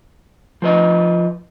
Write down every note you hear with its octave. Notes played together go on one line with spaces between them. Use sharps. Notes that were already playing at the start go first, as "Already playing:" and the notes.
F3 B4 D#5